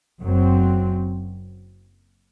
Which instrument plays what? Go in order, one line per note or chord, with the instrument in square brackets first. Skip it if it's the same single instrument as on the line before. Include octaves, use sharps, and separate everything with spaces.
[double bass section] F#1 F#2 F#3 C4